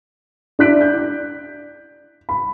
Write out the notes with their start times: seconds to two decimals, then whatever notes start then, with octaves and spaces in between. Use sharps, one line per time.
0.59 D4 E4 F#6 B6 D7
0.81 G6
2.29 B5